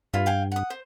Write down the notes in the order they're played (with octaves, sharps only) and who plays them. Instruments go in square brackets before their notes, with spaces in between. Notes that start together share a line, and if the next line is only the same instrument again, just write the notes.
[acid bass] G2 [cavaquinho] E4 F4
[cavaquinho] F5 G5 G#5
F#5 D#6
C5